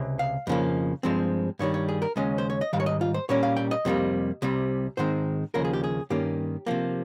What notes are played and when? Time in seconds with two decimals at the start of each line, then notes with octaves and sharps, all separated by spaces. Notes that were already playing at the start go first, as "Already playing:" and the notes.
Already playing: C#2 C3
0.19 F5
0.47 F2 C#3 F3 A#3
1.03 G2 F3 G#3 C4
1.59 G2 D#3 G3 C#5
1.74 C#5
1.89 G#4
2.02 A#4
2.16 D#2 C#3 G#3 C#4 D#5
2.38 C5
2.50 C#5
2.61 D#5
2.73 G#2 D#3 G3 F5
2.80 C#5
2.86 D#5
3.01 F4
3.14 C5
3.29 A#2 G3 A#3 C#4 C#5
3.43 F5
3.57 G5
3.71 D#5
3.85 F2 C3 G3 A#3
4.42 C2 C3 G3
4.97 G#2 D#3 G#3 C4 C5
5.54 D#2 C#3 F3 A#3 A#4
5.65 G#4
5.73 G4
5.84 G#4
6.10 G2 D#3 A#3 C#4 G4
6.66 C3 F3 A#3